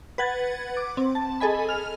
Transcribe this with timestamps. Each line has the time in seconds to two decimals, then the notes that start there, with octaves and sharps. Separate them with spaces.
0.18 B4 F#5 G#6 A6
0.77 D6
0.97 C4
1.15 A5
1.40 G#4 A4 D#5 G#5 B5
1.69 F6 F7